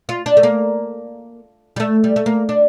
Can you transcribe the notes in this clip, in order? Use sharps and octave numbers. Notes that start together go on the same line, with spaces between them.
F4
D4
A3
A#3
G3
A3
G3
A3
A#3
D4